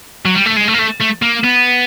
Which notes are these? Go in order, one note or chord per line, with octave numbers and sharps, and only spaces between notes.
F#3
G3
A3
G#3
A3
A#3
A3
A3
A#3
B3